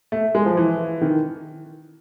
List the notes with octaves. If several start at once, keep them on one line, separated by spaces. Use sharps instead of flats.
A3
G#3
F3
E3
D#3